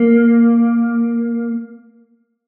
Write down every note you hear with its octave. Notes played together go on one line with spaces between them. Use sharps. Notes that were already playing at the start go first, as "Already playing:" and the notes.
Already playing: A#3